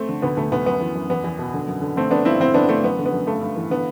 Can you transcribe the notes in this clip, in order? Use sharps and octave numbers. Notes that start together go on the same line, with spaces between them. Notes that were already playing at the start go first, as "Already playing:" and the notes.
Already playing: A3 C4
D3
D2 B3
D2 A3
D2 B3
F#2 B3
E3
F#2
E2 B3
E2
B2
D3
F#2
D3
D3 A3 C4
D3 B3 D4
G2 C4 E4
D3 C4 E4
D3 B3 D4
D3 A3 C4
F#2 B3
D3
B3
F#2
G2 A3
G2
E3
D3 B3